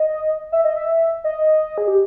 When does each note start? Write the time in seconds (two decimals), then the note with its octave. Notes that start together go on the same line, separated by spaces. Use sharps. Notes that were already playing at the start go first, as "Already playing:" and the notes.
Already playing: D#5
0.52 E5
0.64 D#5
0.76 E5
1.24 D#5
1.78 G#4
1.88 G4